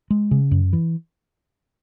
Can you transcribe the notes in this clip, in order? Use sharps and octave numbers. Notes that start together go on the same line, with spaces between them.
G#3
C#3
F#2
E3